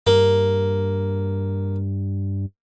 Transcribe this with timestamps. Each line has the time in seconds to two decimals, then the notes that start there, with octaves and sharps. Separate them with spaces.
0.07 G2 A#3